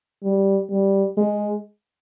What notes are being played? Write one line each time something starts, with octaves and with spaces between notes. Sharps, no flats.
G3
G3
G#3